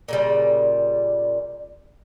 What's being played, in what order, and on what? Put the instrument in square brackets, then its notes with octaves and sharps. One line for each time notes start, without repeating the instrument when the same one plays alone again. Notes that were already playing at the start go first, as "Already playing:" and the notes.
[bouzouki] A#2 C#3 G3